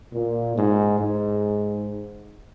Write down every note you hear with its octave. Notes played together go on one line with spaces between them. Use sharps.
A#2
G#2
G#2